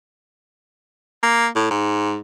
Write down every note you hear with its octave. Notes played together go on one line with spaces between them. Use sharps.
A#3
A2
G#2